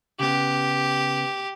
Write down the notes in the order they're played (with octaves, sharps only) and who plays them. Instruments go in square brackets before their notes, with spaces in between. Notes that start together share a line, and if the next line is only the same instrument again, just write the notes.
[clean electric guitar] C#3 B3 [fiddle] G4